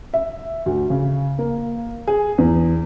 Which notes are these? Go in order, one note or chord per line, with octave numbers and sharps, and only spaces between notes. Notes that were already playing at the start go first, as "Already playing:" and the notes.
E5
D2
C#3
A#3
G#4
E2